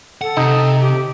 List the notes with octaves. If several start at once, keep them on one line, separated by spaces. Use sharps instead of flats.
A4 F#5
C3 D#4
G4